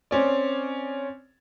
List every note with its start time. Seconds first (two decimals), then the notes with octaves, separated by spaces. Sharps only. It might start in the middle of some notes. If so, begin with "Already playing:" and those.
0.11 C4 C#4 D5